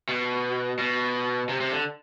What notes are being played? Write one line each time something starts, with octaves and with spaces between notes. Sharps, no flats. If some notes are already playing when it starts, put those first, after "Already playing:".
B2
B2
C3
C3
D3